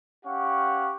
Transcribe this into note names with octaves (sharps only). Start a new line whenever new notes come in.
C#4 G4 F5 F#5 C#6